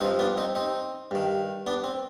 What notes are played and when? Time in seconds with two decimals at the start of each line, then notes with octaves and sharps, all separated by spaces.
0.01 G2 C4 D#4
0.05 F3
0.19 B3 D4
0.37 C4 D#4
0.55 C4 D#4
1.11 G2 D#3
1.67 B3 D4
1.84 C4